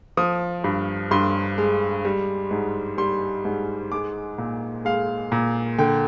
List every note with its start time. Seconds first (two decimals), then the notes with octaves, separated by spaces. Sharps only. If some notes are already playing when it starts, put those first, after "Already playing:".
0.17 F3 D#6
0.64 G2
1.11 G2 C6
1.58 G#3
2.05 G3
2.51 G#2
2.98 G3 C6
3.45 G#2
3.92 G#3 D6
4.38 A#2
4.85 G#3 F5
5.32 A#2
5.79 D3 G5